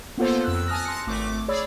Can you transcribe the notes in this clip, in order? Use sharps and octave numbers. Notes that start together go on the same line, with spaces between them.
A#3 B3 F4 A4 C5
F2 E6 F#6
G#5 A5 D#6 F6 F#6 A#6
A5 C6 F#6 A#6 C#7
G#1 A3 D6
G#4 C#5 D5 B5 D6 E6